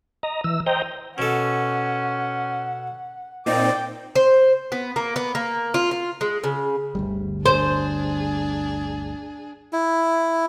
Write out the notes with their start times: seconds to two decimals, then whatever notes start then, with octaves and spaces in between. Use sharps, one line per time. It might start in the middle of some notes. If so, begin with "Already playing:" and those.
0.23 D#5 A#5
0.44 E3 E6
0.66 C5 D#5 G5 A#5
1.18 B2 C#4 A4 F#5
3.46 A#2 C4 D#4 D5 G5 D6
4.15 C5
4.72 B3
4.96 A#3
5.16 B3
5.35 A#3
5.74 F4
5.91 F4
6.21 G#3
6.44 C#3
6.95 G1 D2 G3
7.46 D4 G#4 C5
9.73 E4